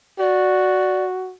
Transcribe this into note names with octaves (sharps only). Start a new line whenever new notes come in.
F#4 D5